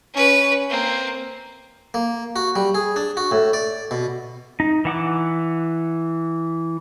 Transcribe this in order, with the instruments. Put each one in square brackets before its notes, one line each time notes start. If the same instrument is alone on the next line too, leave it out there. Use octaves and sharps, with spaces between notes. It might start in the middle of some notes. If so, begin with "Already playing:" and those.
[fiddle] C#4 B4
A#3 C4
[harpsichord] A#3
F#4
G3
G#4
D4
F#4
A2
D5
B2
[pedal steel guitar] D#4
E3 F#5 D6